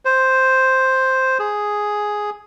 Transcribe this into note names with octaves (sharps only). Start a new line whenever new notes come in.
C5
G#4